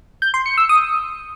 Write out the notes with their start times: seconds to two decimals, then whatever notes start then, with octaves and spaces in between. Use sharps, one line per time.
0.22 G6
0.34 C6
0.46 C#7
0.58 E6
0.69 D#6